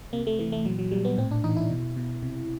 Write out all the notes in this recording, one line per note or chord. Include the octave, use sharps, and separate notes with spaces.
C3 A#3
A3
E3 A3
A3
A#2 F#3
F#3
A#2 G3
B3
A2 C4
D4
E3 D#4
E4
B2
B2
C3